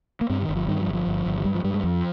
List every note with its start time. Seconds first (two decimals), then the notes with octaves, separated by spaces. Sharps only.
0.21 A#3
0.30 G2 C4
0.42 D#3
0.49 G1
0.56 F3
0.68 G2 D#3
0.81 F3
0.87 G1
0.94 F3
1.07 G1
1.26 G1
1.40 F3
1.45 G2 G3
1.55 F3
1.64 G2 G3
1.74 G#3
1.84 F2 F3